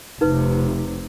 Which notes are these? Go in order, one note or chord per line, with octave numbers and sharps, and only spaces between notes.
F1 C3 D#4 B4